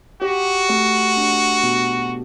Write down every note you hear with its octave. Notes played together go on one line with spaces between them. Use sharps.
F#4 G4
A3
D4
B2